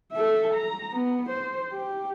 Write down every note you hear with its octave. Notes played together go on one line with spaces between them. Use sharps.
A4 E5
A#5
B3
C5
G4